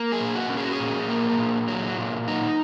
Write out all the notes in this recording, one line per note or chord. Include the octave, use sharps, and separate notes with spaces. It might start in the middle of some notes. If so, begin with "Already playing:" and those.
Already playing: A#3
G#4
A#2
F#4
C#4
G#4
F#4
G#4
A#2
A#3
A#2
F#3
A#2
D#4